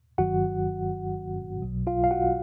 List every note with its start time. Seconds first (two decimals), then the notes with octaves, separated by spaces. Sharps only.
0.18 G1 G2 D#3 F#3 F#4 F#5
1.62 B1 B2 F#3
1.87 F4 F5
2.04 F5
2.11 F#4 F#5